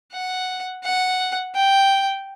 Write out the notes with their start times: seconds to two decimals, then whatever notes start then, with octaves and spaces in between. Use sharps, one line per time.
0.12 F#5
0.84 F#5
1.55 G5